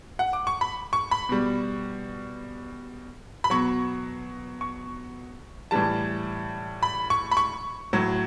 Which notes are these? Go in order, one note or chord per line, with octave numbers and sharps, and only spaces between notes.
F#5
D6
C#6
B5
C#6
B5
B2 G3
B5
B2 F#3 C#6
C#6
A2 E3 G3 A5
B5
C#6
B5
C#6
A2 F#3